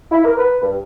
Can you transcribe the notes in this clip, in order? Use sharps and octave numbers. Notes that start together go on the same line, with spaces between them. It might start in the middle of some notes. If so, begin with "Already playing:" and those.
E4
A#4
B4
G2